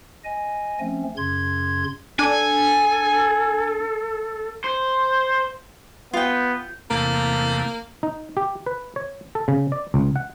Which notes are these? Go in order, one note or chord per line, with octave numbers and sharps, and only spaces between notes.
D#5 G#5
F3 A3 C4 C#4
F#2 C#3 C6 G#6
D4 A4 G#5
C5
B3 F4 G5
E2 C3 A3 A#3
D#4
G4
B4
C#5
A4
C#3
D5
C#2
F#5